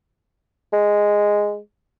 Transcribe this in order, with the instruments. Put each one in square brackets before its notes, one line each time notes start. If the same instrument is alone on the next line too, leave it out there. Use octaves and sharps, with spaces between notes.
[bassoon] G#3